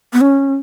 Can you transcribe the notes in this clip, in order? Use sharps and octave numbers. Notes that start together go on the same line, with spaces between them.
B3
C#4